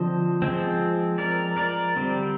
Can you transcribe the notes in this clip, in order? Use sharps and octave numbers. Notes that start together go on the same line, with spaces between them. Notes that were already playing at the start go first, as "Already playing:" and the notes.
Already playing: D3 F3 C4 C5 D#5
F3 G#3 C4
A#4 D5
A#4 D5
D3 G3 C4